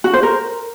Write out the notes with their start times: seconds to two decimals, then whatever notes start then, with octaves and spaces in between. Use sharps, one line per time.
0.04 F#4
0.13 C5
0.23 A#4